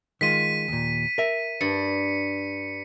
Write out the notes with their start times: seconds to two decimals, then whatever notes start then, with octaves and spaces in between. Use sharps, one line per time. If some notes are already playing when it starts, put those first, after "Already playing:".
0.21 D#3 G#3 F4 B6 D#7
0.68 D#2 A#2
1.18 A#4 E5
1.61 G2 C#7